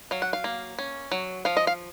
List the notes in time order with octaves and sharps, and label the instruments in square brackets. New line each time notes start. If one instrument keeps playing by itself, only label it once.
[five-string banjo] F#3 F5
F#5
F5
A#3
C#4
F#3
F3 F5
D#5
F5